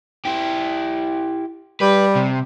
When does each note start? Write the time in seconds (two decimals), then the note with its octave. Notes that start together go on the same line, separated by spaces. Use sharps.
0.25 E4 G4
1.81 G3 B4
2.16 C3